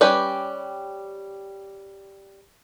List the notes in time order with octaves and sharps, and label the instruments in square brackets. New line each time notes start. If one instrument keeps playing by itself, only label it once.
[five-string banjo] G3 C#4 G4 B4 D5